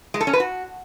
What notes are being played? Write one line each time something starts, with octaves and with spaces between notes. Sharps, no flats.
G#3
A4
C#4
B4
F#4